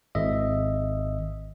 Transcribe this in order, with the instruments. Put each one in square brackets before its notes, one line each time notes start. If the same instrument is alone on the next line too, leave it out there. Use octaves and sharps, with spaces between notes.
[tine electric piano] G#1 D#5 E5